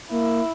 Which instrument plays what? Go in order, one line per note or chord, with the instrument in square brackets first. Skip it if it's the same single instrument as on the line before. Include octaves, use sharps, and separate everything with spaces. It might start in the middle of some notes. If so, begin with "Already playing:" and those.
[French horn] A#3 [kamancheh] E4